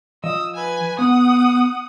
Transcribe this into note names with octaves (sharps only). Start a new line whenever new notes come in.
F3 D#5 D#6 E6
B4 G#5
B3 F#5 D#6